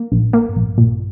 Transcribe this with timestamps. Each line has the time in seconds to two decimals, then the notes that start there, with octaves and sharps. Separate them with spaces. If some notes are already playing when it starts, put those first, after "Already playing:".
Already playing: A#3
0.12 A#1
0.33 A#3
0.49 G2
0.56 A#1
0.78 A#2